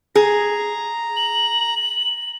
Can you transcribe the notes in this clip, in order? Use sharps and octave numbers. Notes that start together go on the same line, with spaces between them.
G#4 A#5
F#7